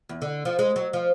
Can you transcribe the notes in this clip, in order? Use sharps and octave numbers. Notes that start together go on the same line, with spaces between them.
E2
D3
F3
G#3
F#3
F3